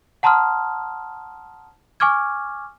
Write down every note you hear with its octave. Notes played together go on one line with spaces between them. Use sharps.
F#5 A5 A#5 C6 D#6 F6
G#5 C#6 D6 F6 G#6